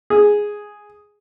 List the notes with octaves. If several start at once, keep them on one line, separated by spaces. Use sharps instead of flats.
G#4